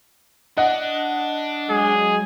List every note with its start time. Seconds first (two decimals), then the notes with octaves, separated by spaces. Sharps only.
0.57 D4 D#5 F#5
1.70 F#3 G#3 G#4